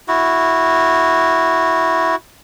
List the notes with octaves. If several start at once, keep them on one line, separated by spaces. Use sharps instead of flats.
E4 F#4